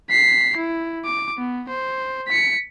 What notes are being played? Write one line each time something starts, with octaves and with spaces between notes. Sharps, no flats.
B6 C7
E4
D6
B3
C5
B6 C#7